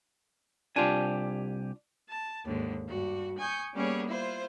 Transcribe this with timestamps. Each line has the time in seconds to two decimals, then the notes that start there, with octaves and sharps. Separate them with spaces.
0.76 C2 D4 F4 G4 G#5
2.09 A5
2.45 D#2 G#2 D3
2.88 G2 F#4
3.38 G#5 C#6 D#6 G6
3.75 G3 A#3 B3 C#4 G#4 C#5
4.07 E4 F4 C5